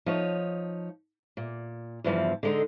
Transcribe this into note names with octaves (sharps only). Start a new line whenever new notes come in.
F3 D#4 C#5
A#2
E2 G2 C#3 E3 F3
D3 G#3 D#4